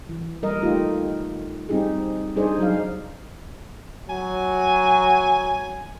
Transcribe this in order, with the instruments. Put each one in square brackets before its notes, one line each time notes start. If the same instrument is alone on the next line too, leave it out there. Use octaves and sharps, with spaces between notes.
[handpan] E3
G3 A#4 D#5
A3 D#4 F4 G4
G3 C4 D#4 G4 G#4
G3 D4 D#4 G#4 C5 D5
F#3 D#4 G#4 F5
[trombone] F#3 [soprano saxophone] G#5